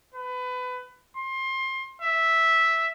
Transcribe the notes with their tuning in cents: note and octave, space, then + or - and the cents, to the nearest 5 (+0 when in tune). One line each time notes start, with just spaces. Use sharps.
B4 +25
C6 +25
E5 -5